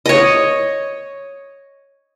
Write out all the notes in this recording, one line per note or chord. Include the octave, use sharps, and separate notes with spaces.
C#5 D#5